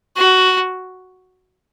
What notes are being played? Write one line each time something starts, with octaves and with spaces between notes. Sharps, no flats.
F#4